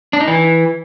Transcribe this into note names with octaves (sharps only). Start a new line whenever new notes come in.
D4
D#4
E3